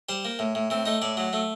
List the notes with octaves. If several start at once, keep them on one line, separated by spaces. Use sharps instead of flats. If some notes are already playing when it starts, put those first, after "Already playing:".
G3 C5
A#3
A2
A2
A2 C4
A3 D#4
A2 D5
F#3
A3